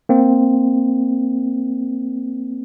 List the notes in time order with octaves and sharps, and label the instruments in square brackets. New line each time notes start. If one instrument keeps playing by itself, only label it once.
[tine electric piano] A#3 C4